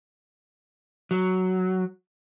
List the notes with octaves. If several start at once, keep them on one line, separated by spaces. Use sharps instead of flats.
F#3